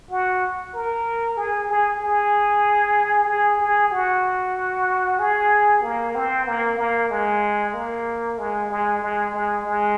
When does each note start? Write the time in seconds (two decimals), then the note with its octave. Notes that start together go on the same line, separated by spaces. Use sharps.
0.10 F#4
0.74 A#4
1.37 G#4
1.69 G#4
2.00 G#4
3.28 G#4
3.60 G#4
3.91 F#4
5.19 G#4
5.82 A#3
6.15 C4
6.47 A#3
6.78 A#3
7.10 G#3
7.74 A#3
8.38 G#3
8.70 G#3
9.02 G#3
9.34 G#3
9.65 G#3